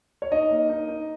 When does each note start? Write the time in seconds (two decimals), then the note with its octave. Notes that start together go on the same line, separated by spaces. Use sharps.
0.22 C#5
0.32 D#4 D#5
0.51 A#3
0.69 D#4
0.88 D#4